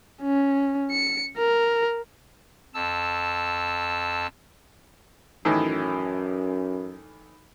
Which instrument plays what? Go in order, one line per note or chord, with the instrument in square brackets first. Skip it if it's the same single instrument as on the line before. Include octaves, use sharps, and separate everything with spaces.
[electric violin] C#4
C#7
A#4
[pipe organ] F2 A5 E6
[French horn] F#2 [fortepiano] A2 D#3 E3